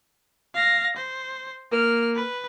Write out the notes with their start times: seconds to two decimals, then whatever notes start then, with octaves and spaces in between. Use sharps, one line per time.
0.55 F5 A#6
0.97 C5
1.73 A#3 F6
2.15 B4